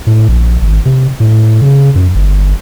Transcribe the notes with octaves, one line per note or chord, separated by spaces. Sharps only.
A2
A#1
G#1
C3
A2
C#3
F#2
G1